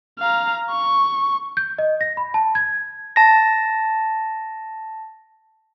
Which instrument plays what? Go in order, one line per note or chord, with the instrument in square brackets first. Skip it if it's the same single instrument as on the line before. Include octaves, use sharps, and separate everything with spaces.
[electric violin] F5 A#5
C#6
[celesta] G6
D#5
A#6
B5
A5
G#6
[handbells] A5 A#6